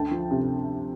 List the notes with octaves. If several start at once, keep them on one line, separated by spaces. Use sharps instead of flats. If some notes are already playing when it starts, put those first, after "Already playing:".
Already playing: D2 G5 A5
F3
C3